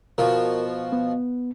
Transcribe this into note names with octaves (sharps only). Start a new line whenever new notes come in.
B2 F3 A#4
B3